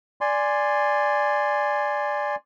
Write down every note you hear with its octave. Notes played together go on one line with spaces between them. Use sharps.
D5 G#5 C6